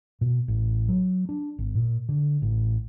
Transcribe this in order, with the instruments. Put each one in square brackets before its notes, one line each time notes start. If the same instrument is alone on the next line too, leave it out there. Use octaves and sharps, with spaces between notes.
[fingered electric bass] B2
A1
F#3
D4
G#1
A#2
D3
A1